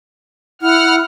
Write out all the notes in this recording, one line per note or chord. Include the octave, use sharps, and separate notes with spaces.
E4 F#5 F6